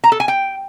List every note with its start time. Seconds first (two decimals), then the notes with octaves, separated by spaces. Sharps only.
0.04 A#5
0.12 A4
0.20 G#5
0.28 G5